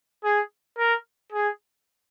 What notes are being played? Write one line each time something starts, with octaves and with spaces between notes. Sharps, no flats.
G#4
A#4
G#4